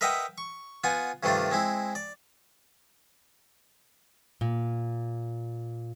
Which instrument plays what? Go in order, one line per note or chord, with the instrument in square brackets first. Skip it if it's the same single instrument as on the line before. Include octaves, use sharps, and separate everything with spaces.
[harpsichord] A#4 B4 D#5 E5 F#5 G5
C#6
B3 F4 F#5 G#5
G2 C3 D#3 A3 D4 F4
G#3 C4 E4
D5
[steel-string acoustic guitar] A#2